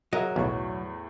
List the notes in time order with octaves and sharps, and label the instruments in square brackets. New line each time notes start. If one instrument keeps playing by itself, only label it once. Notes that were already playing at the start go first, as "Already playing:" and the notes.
[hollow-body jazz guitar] F#3 [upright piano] G#4 A#4 E5 [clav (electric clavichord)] D#5
[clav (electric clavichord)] B1 [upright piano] E2 A2 C#6